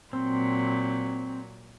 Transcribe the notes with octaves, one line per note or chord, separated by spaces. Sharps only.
A#2 F#3 C4